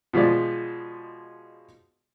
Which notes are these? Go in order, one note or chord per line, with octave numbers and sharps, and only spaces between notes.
B2 F3 G#3 D5